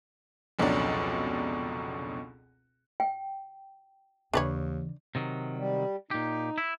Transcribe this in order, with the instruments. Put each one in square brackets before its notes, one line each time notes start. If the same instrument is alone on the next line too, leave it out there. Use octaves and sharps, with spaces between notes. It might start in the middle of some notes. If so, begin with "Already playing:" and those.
[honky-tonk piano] F1 C#2 B2 F#3 D4
[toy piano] G5
[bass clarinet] D#2 [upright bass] C#3 E3 [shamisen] D4 B4 C#5
[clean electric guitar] C3 D#3 F#3
[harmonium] G3
[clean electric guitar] A#2 G4 [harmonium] D#4
[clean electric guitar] E4